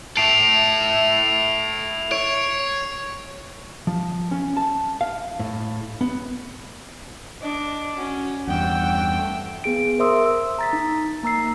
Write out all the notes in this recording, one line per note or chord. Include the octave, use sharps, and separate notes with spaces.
E4 A4 C7 D7 F7
C#5 D7
F3
C#4
A5
F5
A2
B3
D4 D#5 D6
C#4 F#4
E2 G2 F#5 G5 E6
A3
B3 G#4 D7
A#4 C5 E5 C6 D#6 E6
E6
A#5 A6 B6
D#4
A#3 A#5 E6 C7